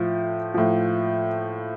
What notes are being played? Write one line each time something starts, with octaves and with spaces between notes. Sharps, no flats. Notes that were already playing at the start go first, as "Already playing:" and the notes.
Already playing: A2 F3
A2 F3